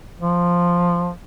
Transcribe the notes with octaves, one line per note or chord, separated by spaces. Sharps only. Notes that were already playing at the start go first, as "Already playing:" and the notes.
F3